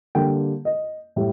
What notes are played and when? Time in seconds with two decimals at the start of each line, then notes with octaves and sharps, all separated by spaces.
0.15 D3 G3 A#3 G5
0.65 D#5
1.16 A2 G3